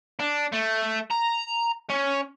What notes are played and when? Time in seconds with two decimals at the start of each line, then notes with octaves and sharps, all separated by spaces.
0.19 D4
0.52 A3
1.11 A#5
1.90 C#4